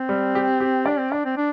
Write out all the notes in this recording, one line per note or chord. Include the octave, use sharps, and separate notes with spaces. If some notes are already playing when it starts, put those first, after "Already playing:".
Already playing: C4
G3
G4
G4
D4 D5
C4
D4 D5
C4
D4